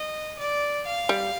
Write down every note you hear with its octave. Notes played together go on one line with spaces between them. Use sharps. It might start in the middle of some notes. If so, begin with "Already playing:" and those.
Already playing: D#5
D5
F5
G3